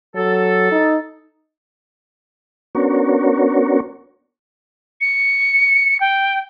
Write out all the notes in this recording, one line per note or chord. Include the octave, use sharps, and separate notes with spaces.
F#3 A4
D#4
B3 C#4 D4 F#4 A#4 C#5
C#7
G5